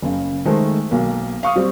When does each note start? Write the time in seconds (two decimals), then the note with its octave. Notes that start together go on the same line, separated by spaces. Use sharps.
0.02 F#1 C#3
0.45 D#3 G#3 A3 C5
0.91 B1 A#3
1.43 F5 C#6 D#6
1.56 G3 C4